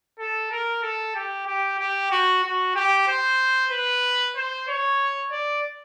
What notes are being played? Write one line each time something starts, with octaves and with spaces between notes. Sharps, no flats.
A4
A#4
A4
G4
G4
G4
F#4
F#4
G4
C5
B4
C5
C#5
D5